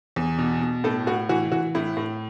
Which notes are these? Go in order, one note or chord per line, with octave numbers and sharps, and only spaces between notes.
E2
B2
B2
A2 A4
A2 F#4
E3 F#4
E3 F#4
A2 E4
A2